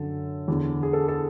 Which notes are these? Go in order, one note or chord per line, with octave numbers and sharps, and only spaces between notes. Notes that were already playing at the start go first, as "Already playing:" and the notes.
Already playing: F#2 D3 A4
E2 D3
G#4
A4
A4